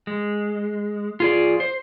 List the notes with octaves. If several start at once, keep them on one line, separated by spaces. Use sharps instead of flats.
G#3
F4 G#4 D5
C5